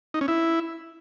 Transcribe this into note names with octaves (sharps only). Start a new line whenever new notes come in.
D#4
C#4
E4